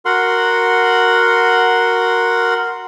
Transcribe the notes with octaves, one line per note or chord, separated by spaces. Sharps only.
F#4 A#4 F#5 C6